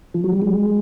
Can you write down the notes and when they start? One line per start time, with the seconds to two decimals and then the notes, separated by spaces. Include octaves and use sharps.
0.14 F3
0.24 F#3
0.32 G3
0.42 G#3